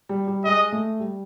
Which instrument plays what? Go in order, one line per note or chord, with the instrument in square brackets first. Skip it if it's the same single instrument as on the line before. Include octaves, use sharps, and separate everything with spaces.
[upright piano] G3
G3
[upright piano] G#3 [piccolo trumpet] D#5
[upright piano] A3
G3